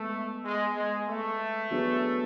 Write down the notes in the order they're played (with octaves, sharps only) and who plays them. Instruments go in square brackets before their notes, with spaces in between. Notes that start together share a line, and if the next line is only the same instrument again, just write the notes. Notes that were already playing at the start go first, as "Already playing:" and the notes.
Already playing: [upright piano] G#3 B3 [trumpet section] A3
[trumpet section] G#3
G#3
A3
[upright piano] F#3 B3 D4 G#4